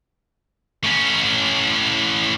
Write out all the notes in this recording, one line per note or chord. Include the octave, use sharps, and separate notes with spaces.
A2 C#4